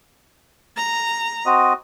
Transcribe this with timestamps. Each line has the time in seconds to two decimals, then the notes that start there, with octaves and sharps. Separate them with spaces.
0.77 A#5
1.46 C4 F#4 D#5